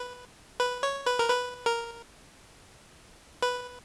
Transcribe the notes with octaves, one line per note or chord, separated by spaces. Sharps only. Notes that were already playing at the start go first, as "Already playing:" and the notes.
Already playing: B4
B4
C#5
B4
A#4
B4
A#4
B4